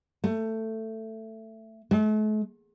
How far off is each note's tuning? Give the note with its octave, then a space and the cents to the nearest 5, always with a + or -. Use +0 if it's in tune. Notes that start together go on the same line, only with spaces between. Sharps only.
A3 +15
A3 -45